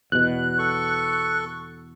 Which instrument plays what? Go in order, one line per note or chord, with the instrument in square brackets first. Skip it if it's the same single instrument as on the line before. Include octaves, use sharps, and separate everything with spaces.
[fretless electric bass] E2 B2 [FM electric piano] F#6
[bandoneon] A4 C#6